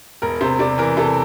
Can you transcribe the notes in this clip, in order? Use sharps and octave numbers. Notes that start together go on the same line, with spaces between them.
E1 A#4
C3 C5
C3 D5
E3 A#4
C3 A4